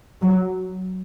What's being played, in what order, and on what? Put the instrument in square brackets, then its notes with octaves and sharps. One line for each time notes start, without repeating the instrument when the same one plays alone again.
[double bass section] F#3